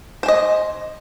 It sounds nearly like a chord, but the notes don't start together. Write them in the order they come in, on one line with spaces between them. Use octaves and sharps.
C5 G#5 D#5